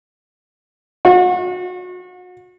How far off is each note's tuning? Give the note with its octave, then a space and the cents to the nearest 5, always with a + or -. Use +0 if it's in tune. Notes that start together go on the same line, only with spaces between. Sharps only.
F#4 -35